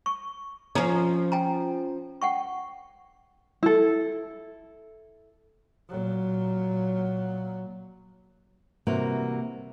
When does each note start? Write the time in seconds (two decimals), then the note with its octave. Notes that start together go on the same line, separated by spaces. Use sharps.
0.06 C#6
0.75 F3 C#4 A4 A#5
1.32 G5 G#5 A#5
2.22 F#5 G5 C#6
3.63 E4 A4
5.89 A#2 F#3
8.87 C3 E3 G3 A#3 F#4 A#4